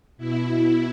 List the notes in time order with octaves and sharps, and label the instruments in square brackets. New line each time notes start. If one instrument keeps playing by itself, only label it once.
[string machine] B2 E4